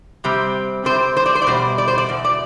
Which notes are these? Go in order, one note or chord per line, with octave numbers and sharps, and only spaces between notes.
C3 G3 C4
C3 G3 C4 C5
C5
D5
C5
D5
E2 B2 G3 C5
D5
C5
D5
E2 B2
D5